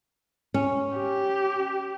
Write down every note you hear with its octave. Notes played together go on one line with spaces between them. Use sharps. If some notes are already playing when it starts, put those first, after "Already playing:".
C#4
G4